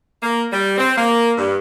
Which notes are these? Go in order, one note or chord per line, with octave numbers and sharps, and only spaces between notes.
A#3
G3
C4
A#3
G2